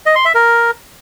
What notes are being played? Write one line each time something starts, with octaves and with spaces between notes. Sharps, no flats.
D#5
C6
E5
A#4